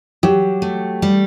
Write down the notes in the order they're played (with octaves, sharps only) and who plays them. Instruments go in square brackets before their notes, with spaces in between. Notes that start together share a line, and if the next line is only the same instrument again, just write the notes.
[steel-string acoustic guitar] F#3 [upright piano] G4
[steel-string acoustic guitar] A3
G3